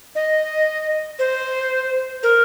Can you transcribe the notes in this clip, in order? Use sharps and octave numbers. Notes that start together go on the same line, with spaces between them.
D#5
C5
A#4